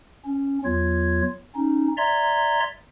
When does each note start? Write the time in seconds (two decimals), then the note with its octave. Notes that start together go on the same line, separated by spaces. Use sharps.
0.25 C#4
0.64 E2 F#3 F4 G#6
1.55 C#4 D#4
1.97 D5 E5 A#5 C6 G#6